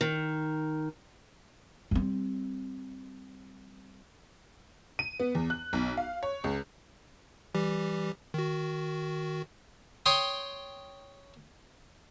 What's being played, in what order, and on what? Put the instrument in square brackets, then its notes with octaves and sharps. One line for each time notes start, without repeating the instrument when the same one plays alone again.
[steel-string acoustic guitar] D#3
[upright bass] G3 C4
[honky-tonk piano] D#7
B3
E2
F#6
B1
F5
C#5
C#2
[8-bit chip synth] E3 G3 G4
D#3 F#4
[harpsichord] C#5 G5 C6 D#6